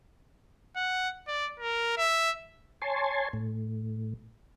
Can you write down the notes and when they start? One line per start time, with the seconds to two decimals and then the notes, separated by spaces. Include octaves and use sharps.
0.76 F#5
1.28 D5
1.60 A#4
1.98 E5
2.82 C#5 G#5 A5 C6
3.33 A2